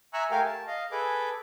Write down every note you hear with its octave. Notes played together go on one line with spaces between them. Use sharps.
E5 G#5 A#5 C#6 E6 F#6
A3 G4 A#4 F5 G5 G#5
A5
D#5 F5
G#4 A4 B4 D6